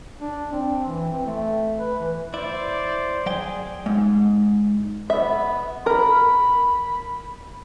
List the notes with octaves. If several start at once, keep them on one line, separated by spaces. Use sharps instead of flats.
D4
C4
E3
C4
A3
B4
E3
E4 C5 D5
F#3 G#4 D5 G5
G#2
B3 E5
A#4 B5